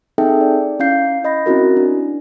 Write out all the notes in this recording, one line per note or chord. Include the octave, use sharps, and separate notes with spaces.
C4 D#4 G#4 A4 E5 G5
D5
C#4 E4 F5 G6 C7
D#5 B5 A#6
C4 C#4 E4 F#4 A#4
D4